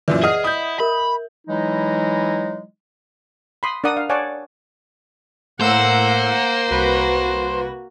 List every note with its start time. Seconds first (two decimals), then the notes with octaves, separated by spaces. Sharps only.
0.08 F#2 A#2 E3 B4 D5 E5
0.24 G#4 D#5 F#5 D#6 F6
0.44 E4 D#6 G6
0.80 A#4 E5 B5
1.47 E3 F#3 G#3 D#4 E4
3.63 B5 C6 D#6
3.84 D4 A#4 D5 F#5 D#6
3.97 F5
4.09 C#5 D5 F#5 G#5 A5
5.61 A2 A#3 A#4 C5 F#5 E6 E7
6.71 C2 F#4 B4